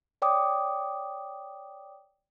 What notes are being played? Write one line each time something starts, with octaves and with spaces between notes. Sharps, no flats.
C#5 D5 G5 D6 D#6